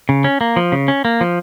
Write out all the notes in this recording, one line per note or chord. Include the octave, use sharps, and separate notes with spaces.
C#3
C#4
A#3
F3
C#3
C#4
A#3
F3